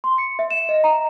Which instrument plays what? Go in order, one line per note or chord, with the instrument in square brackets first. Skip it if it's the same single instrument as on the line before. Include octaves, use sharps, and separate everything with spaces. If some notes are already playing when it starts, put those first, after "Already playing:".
[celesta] C6
C#7
E5
E7
D#5
A#5